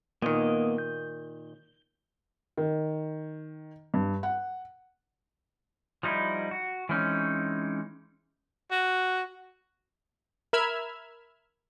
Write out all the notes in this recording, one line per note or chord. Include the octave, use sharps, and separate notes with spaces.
A#2 D#3 A#3 B3 D#5
G6
D#3
G2
F#5
F3 G3 D#4 E4
F#4
E3 G#3 C4 C#4 D#4
F#4
A#4 E5 B5 E6 F6 G#6